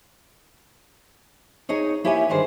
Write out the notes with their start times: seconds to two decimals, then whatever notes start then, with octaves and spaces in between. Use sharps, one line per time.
1.69 D#4 G#4 C#5 D#5
2.04 A#3 E4 G4 C#5 E5 G#5
2.29 G2 D3 D#3 G#4 C5 D5